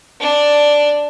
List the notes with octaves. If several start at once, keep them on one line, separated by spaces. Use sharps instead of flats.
D4 D5